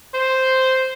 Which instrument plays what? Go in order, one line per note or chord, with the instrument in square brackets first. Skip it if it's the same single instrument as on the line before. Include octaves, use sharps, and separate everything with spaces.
[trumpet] C5